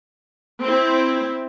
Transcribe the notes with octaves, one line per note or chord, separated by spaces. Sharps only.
C4 E4